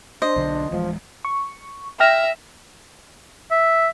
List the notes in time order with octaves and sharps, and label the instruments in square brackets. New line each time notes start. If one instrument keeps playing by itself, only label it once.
[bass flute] D4 [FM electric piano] C5 [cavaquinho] D#5
[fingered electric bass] B1 D3
[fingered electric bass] D1 E3 G#3 [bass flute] F3
[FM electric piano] C#6
[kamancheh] E5 [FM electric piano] G5 F6 A#6
[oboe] E5